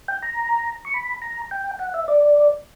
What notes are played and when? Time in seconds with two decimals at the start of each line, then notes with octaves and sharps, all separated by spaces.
0.08 G5
0.23 A#5
0.85 C#6
0.94 B5
1.22 A#5
1.51 G5
1.79 F#5
1.94 E5
2.08 D5